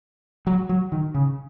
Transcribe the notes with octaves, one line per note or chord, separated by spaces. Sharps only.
F#3
F#3
D#3
C#3